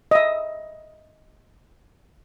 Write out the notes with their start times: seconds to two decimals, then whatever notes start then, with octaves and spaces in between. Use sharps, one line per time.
0.11 D#5 E5